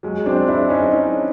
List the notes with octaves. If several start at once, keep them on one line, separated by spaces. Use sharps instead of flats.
F#3 G#3
C4 D4
D4 E4
C#4 D#4
C#4 D#4